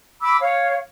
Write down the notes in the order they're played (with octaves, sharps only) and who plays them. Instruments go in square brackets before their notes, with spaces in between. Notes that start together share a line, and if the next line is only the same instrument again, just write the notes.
[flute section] B5 D6 E6
C#5 F5